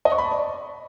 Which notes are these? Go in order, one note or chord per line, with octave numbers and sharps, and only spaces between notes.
D#5
C#6
B5
A5
D5